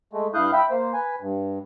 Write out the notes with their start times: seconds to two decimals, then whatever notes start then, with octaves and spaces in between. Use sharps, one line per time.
0.13 G#3 A3
0.34 G2 E4 F5 D#6 F#6 G6
0.53 E5 G5 B5
0.71 A#3 C5
0.94 B4 G#5
1.21 G2